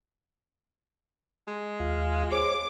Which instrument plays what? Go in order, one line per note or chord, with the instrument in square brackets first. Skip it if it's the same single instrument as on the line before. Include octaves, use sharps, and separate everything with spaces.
[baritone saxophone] G#3
[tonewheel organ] D#2 F4 F5
[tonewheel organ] G#4 C5 C#5 [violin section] D6